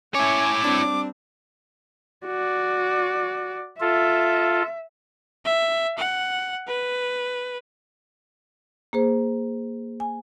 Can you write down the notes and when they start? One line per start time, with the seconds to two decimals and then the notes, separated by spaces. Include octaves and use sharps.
0.15 C#4 E4 C#5 G#5 D6
0.64 G3 C4 D4
2.26 F#4 D5
3.80 F4 A4 E5
5.45 E5
5.98 F#5
6.67 B4
8.93 A#3 G#4 C5
10.00 G#5